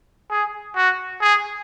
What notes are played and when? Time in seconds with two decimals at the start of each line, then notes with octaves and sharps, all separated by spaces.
0.31 G#4
0.76 F#4
1.21 G#4